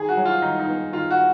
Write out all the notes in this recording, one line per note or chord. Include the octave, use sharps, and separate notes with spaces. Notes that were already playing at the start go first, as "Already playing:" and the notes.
Already playing: D#3 G#4
F#4
F#3
F4
D#3 D#4
D#4
B3
D#3 F4
F#4